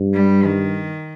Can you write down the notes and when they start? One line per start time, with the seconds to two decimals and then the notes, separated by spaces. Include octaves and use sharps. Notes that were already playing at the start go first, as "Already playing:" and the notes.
Already playing: G2
0.14 G3
0.46 D#3